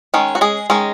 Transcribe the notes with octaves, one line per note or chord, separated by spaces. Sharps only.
D#3 G#3 C#4
F#4
G#3 G#4
D#3 G#3 C#4